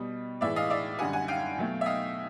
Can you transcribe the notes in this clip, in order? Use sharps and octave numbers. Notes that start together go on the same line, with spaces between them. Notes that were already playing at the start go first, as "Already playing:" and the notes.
Already playing: B2 G3 D#5
A2 E3 G#3 D5 E5
D#5 F5
D5 E5
F#2 D3 G3 F#5 G#5
F#5 G#5
F5 G5
B2 F#3 A3
E5
D#5 F5